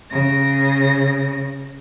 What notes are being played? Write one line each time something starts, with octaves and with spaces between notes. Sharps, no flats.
C#3 A#6